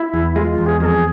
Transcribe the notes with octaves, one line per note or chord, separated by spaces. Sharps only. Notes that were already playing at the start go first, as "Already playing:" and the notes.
Already playing: E4
E2
G#3 F4
F4
E2
G#4
F2 G#4 A#4